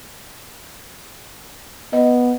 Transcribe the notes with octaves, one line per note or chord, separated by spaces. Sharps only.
B3 D#5